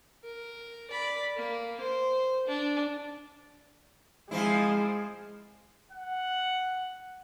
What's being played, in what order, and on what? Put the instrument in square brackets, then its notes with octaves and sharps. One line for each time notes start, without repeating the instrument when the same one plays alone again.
[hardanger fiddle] A#4
D5 B5
A#3
C5
D4
[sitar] F3 C4 E4 [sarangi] G#3
[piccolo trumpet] F#5